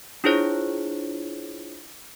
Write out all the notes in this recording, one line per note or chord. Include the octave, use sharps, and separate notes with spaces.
D4 E4 F4 G#4 C5 C#5